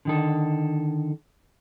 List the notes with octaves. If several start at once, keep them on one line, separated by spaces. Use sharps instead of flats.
D3 D#3 A4